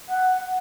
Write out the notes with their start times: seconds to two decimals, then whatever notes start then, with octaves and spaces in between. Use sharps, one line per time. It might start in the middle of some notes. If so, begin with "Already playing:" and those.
0.09 F#5